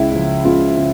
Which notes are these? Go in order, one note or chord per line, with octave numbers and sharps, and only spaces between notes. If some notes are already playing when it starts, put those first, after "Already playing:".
Already playing: C#2 E4
C#3 F3
C#2 F4
C#3